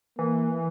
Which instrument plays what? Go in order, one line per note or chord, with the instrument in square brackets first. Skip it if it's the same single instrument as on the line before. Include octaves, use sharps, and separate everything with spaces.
[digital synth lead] E3 [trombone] A#3